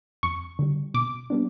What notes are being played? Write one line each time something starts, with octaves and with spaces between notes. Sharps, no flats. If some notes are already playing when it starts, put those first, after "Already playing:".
F2 C#6
D3 G3
B2 D6
G3 B3 D4